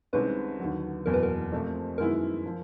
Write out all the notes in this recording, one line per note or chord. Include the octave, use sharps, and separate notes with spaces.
C2 C3 D#3 G#3 C#4 B4
D#2 D3 F#3
F#1 E2 B2 F#3 A#4
B4
A#4
F2 C3 F3 A3
F#2 D#3 G#3 B3 E4 A#4
F3